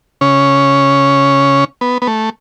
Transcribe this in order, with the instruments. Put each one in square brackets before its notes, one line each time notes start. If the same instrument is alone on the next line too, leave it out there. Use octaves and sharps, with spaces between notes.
[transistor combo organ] C#3 C#4
B3
B3
A3